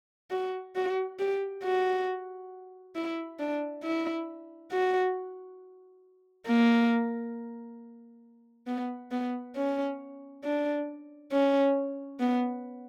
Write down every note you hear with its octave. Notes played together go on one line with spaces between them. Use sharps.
F#4
F#4
G4
F#4
E4
D4
E4
F#4
A#3
B3
B3
C#4
D4
C#4
B3